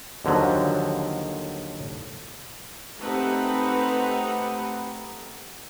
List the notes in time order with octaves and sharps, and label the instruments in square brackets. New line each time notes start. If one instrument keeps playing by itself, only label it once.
[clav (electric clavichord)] D#2 D3 F3 F#3
[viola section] A3 C4 D#4 G4 B4 F#5